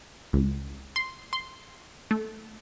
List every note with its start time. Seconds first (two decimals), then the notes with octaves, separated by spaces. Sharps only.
0.33 C#2
0.96 C6
1.33 C6
2.11 A3